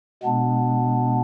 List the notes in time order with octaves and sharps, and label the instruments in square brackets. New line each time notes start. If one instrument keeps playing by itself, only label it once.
[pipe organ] B2 G#3 B3 D4